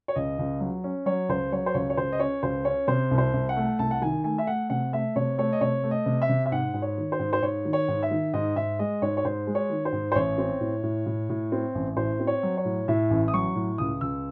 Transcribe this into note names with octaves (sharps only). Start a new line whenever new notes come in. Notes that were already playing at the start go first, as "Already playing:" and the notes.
C#5
C#2 D#5
C#2
F#3
C#4
F#3 C#5
C#2 C5
F#3 C#5
C5
C#2 C#5
C#5
C#2 C5
D#5
C#4 C#5
C#2 C5
C#4 C#5
C3 C5
C2
C5
C2
F#5
A3
C2 A5
F#5
D#3 G#5
A3 G#5
E5
A3 F#5
C3 F#5
A3 E5
C3 C#5
A3 C#5
D#5
C3 C#5
A3
D#5
C3
E5
C3
E5
G#2 F#5
G#2
C#5
D#3
C5
G#2
C5
G#2 C#5
D#3
C#5
G#2
E5
D#3
G#2 D#5
G#2 E5
G#3 D#5
G#2 C#5
C#5
G#2 C5
G#3
C#5
D#3
C5
G#2
C5
A1 C#5
C4
A2
A2
A2
A2
C4
A1
A2 C5
C4
C#5
F#3
C#5
A2
A2 E5
A1
D#6
F#3 C#6
A2
C#2 D#6
C#2 E6